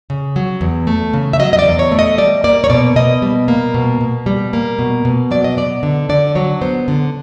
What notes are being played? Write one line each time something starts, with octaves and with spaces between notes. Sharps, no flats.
C#3
F#3
E2
A3
C#3
E5
F#3 D#5
D#5
D5
E2
C#5
A3
D#5
G3 D5
A#3 D5
C#5
B2 D5
B2 D#5
G3
A#3
B2
B2
G3
A#3
B2
B2
F#3 D5
D#5
B3 D5
D3
D3 D5
F#3 C#5
B3 C5
D3